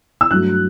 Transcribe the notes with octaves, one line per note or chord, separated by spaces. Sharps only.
E6
G2 F#3 A3 F#6